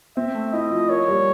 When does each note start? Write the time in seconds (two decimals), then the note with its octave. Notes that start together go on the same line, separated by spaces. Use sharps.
0.17 C4 E5
0.35 A3
0.53 E4 D#5
0.71 F3
0.90 A#3 C#5
1.08 G3